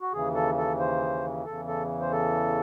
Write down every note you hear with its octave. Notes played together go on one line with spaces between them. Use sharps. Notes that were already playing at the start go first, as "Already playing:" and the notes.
F#4
D#2 C#3 E3 G#4
A4
A4
C5
E2 C#3 E3 A4
A4
C5
A4